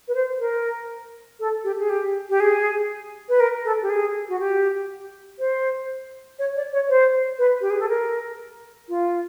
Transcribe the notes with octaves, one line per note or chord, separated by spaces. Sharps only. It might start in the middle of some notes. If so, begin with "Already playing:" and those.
B4
C5
A#4
A4
G4
G#4
G4
G4
G#4
B4
A#4
A4
G4
G#4
F#4
G4
C5
C#5
D5
C#5
C5
B4
G4
G#4
A4
A#4
F4